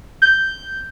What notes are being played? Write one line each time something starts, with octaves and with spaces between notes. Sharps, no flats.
G6